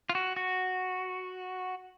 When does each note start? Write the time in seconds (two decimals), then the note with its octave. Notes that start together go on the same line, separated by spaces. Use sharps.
0.09 F4
0.15 F#4
0.36 F#4